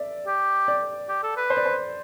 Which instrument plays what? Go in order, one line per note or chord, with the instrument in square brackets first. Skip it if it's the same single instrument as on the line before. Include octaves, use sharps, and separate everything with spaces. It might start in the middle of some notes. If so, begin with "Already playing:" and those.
Already playing: [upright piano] D5 E5
[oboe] G4
[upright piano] D5
[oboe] G4
A4
B4
[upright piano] C5
D5
C5